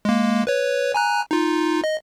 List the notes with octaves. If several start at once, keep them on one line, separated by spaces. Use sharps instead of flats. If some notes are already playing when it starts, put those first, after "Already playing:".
G#3 A#3
B4 C#5
G#5 A#5 F#6
D#4 F4
D#5